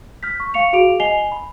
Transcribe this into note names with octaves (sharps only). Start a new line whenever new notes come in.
F6 G6 B6
C#6
F5 C#6 C#7 F7
F#4 G#4 F5 D6 D7 F7
D#5 G#5 C7 F7 G7
B5